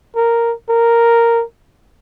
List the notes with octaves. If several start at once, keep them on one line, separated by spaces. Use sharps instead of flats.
A#4
A#4